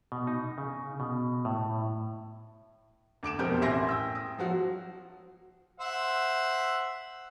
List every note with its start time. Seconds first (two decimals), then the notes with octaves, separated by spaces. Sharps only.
0.12 B2
0.27 D#4
0.58 C#3
1.00 B2
1.45 A2
3.23 D2 D6 D7 E7
3.39 F2 B2 C4 G4 A#4 G6
3.61 A1 E5 G#5 C6 A#6
3.89 G5 E6
4.15 D#6
4.38 F3 F#3 F#4
5.80 C5 E5 F#5